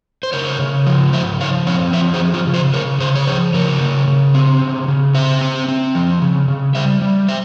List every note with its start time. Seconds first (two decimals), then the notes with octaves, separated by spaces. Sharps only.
0.23 C5
0.33 C#3 A#4 C#5
0.59 C#3
0.87 F3
1.13 C#3 C5 E5
1.40 F3 C#5 F5
1.67 C4 C#5 F5
1.93 F3 C5 E5
2.14 G#4 C5
2.20 F3
2.34 F4 G#4
2.47 C#3
2.54 G#4 C5
2.74 C#3 A#4 C#5
3.00 C#3 G#4 C5
3.15 C#5
3.27 F3 G#4 C5
3.54 C#3 A#4 C#5
3.81 C#3
4.08 C#3
4.34 C4
4.61 C#3
4.88 C#3
5.14 C4 C5 E5
5.41 C4
5.68 C4
5.95 F3
6.22 C#3
6.48 C#3
6.75 G3 C5 E5
7.02 G3
7.28 C5 E5